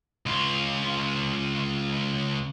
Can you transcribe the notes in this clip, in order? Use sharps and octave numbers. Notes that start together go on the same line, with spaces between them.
C#2 F4